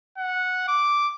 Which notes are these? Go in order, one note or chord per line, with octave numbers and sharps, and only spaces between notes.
F#5
D6